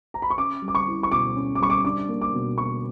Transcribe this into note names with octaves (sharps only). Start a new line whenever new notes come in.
A#5
B5
C#6
C#4 D6
G3
D6
C#6
E4
C#6
B2 D6
C#4
D6
G3 C#6
D6
D4 D6
A#3
D6
B2
B2 C#6